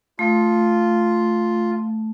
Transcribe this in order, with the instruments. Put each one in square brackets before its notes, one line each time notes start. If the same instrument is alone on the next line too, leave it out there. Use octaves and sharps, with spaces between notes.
[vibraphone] A3 [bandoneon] F4